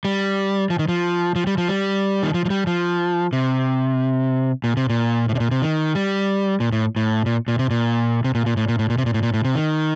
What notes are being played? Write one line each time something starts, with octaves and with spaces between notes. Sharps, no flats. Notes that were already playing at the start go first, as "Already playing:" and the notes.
G3
F3
D#3
F3
F3
G3
F3
G3
D#3
F3
F3
G3
F3
C3
A#2
C3
A#2
A2
C3
A#2
C3
D#3
G3
A#2
A2
A2
A#2
A#2
C3
A#2
C3
A#2
A#2
A2
A#2
A2
A#2
C3
A#2
A2
A#2
A2
C3
D#3